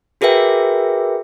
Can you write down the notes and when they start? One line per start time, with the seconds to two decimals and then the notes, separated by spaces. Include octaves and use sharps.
0.21 F#4 G#4 A#4 B4 E5 G5